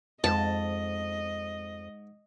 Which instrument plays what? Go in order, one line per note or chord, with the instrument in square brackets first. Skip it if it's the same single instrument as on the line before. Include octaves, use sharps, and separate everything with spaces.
[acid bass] F2 [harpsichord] G#2 [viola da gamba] D#5 [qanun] A5